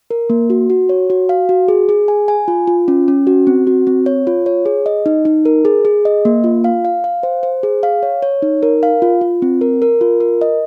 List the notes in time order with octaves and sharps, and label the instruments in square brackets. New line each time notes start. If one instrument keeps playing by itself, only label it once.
[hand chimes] A#4
A#3
F#4
F#4
C#5
F#4
F5
F#4
G#4
G#4
G#5
G#5
F4
F4
C#4
C#4
F#4
C4
F#4
C4
C#5
F4
C#5
G#4
D#5
D#4
D#4
A#4
G#4
G#4
D#5
A#3
F4
F5
F5
F5
C5
C5
G#4
F5
C#5
C#5
D#4
A#4
F5
F4
F4
C4
A#4
A#4
F4
A#4
D#5